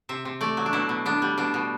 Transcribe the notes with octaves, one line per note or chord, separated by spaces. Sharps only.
C3 E5
C3
A3 D5
F#3
D4
B2 E4
B2
B3 D4
G3
B2 D4
B2